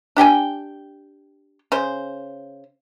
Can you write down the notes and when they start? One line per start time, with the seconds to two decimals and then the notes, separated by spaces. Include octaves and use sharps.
0.17 D4 G4 G5 G#5
1.72 C#3 C5